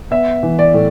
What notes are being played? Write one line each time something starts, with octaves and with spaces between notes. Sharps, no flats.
B3 E5
E3
D5
A2